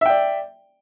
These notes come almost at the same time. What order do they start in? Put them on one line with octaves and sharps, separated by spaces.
E5 G5 D5